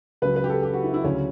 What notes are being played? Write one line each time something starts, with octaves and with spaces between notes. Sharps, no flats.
C#2 C#3 F#3 B4
B4
G4
A4
G4
F#4
E4
E4
D2 C#3 F#3 C#4